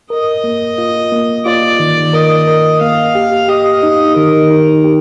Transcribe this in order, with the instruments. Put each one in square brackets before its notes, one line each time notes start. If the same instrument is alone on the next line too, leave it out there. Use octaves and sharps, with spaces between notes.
[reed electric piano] A#4 [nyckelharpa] D#5
[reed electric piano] A#3
F4
A#3
[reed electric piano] F4 [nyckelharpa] D5
[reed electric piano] D#3
[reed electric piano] A#4 [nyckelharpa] D#5
[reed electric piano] A#4
[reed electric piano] A#3 [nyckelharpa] F5
[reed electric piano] G4
[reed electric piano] G4 [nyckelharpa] D#5
[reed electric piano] D#4
[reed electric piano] D#3 [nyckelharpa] A#4
[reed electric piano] D#4
G4